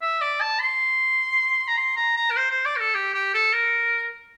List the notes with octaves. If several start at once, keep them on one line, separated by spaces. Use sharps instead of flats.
E5
D5
A5
C6
A#5
C6
A#5
A#5
A#4
C5
C5
D5
A#4
A4
G4
G4
A4
A#4